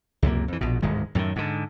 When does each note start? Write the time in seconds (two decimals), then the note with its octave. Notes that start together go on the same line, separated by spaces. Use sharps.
0.22 C#2 F#2 C3 A#3
0.48 F2 E3
0.61 A#1 B2
0.82 D1 G#2 D#3 G#3
1.15 F#2 A2 D3 D#3
1.36 G#2 D3